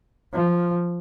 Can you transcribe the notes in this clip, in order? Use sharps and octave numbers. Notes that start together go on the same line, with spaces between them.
F3